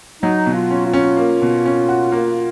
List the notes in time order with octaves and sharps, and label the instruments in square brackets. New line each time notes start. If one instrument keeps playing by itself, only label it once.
[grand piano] F#3 [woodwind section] D#4
[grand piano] B2
[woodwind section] F4
[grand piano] C#4
[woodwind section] F4
[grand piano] C#4
A#3
B2
C#4
F#4
A#3